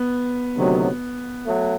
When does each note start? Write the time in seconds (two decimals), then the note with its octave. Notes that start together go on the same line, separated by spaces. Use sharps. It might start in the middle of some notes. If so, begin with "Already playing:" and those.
Already playing: B3
0.57 D2 C3 D#3 F#3
1.45 F#3 A3